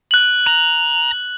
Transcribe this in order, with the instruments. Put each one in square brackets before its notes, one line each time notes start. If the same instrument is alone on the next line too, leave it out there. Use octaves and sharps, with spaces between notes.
[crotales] F#6 F#7
[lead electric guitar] A#5